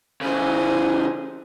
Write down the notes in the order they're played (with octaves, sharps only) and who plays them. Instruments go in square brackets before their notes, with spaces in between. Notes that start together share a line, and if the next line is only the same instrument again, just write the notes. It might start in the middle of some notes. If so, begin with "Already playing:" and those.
[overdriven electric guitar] C#3 E3 [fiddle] G#4 C5